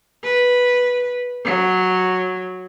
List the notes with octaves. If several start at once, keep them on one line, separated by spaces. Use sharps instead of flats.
B4
F#3